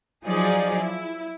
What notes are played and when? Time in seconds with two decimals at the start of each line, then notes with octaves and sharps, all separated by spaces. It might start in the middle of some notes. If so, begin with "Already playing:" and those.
0.24 F3 F#3 D#4 G#4 D5
0.81 E4